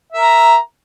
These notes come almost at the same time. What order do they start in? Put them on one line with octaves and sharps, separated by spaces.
E5 A#4 A#5